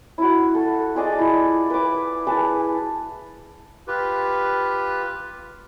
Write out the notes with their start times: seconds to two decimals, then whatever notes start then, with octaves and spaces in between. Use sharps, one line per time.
0.18 E4 F#4
0.55 A4
0.95 F4 G#4 D5 D#5
1.19 E4
1.70 B4 D6
2.27 G#4 B4 A5
3.87 F4 G4 B4